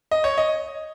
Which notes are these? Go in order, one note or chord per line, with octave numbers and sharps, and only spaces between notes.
D#5
C#5
D#5